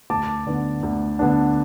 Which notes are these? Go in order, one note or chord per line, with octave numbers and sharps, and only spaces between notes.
D2 A5 D6
D3 B3 D4
D2
D3 B3 D4